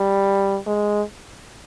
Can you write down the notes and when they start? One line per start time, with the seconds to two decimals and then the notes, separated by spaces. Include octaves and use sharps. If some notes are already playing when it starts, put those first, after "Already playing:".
Already playing: G3
0.66 G#3